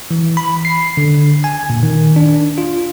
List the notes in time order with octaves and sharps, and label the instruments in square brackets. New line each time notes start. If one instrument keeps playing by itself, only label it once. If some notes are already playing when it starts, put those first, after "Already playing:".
[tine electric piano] E3
B5
C7
D3
G#5
A#2
D#3
D4
F4